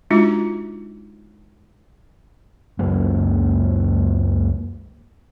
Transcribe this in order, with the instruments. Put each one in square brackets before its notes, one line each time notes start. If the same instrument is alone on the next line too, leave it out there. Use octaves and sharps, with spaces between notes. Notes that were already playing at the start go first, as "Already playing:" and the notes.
[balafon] G#3 D4 D#4 F4 F#4
[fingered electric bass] C#2 F#2 F#3 A#3